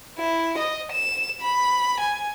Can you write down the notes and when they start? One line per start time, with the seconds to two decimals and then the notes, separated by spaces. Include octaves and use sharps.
0.18 E4
0.58 D#5
0.92 E7
1.41 B5
2.00 G#5